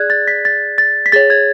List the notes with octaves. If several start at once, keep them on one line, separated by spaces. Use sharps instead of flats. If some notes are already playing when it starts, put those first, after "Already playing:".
Already playing: G#4 D5 F#6 G#6
A6
B6
A6
A6
B6
G#4 C#5 A6
G#6